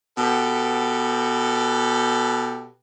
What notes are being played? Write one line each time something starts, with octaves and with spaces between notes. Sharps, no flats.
B2 B3 G4 A4